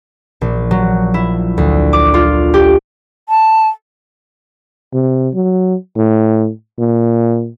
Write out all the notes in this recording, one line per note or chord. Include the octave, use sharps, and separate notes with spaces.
A#1
F#3
E4
D2
D6
F4
G4
A5
C3
F#3
A2
A#2